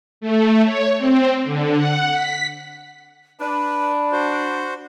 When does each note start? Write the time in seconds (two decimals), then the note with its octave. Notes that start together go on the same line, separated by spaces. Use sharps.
0.21 A3
0.65 C#5
0.98 C4
1.44 D3
1.75 F#5
2.12 B6
3.40 D4 B4 B5
4.12 F#4 C5